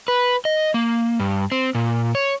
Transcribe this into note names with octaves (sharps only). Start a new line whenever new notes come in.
B4
D#5
A#3
G2
C4
A#2
C#5